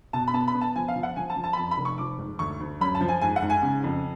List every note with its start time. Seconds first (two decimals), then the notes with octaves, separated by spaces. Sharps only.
0.13 B2 A5
0.28 B5
0.34 B3 A5
0.48 B5
0.55 B3
0.61 A5
0.76 F3 G#5
0.88 F5
0.96 F3
1.03 F#5
1.16 F3 G#5
1.30 A5
1.36 F3
1.44 A5
1.53 B5
1.57 F2 A5
1.71 B5
1.78 F1
1.85 C#6
1.98 F3 D6
2.18 G#2
2.39 D2 C#6
2.60 D2
2.81 F#2 B5
2.95 A5
3.01 F3
3.08 G#5
3.21 G#2 G#5
3.36 F#5
3.42 G#2
3.50 G#5
3.62 C#3
3.84 F2